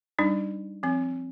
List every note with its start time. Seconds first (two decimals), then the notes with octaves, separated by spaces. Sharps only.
0.19 G3 D4 D#4
0.83 F3 C4